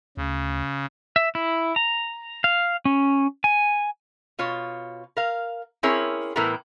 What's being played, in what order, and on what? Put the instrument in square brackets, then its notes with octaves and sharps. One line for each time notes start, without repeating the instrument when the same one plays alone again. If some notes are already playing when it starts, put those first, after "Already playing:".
[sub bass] D2 [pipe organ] C#3
[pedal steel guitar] E5
E4
A#5
F5
C#4
G#5
[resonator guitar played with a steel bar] B2 F4 C#5
A#4 F5
C4 C#4 E4 G#4 A#4 C#5
A2 E3 B3 A4 A#4 A#5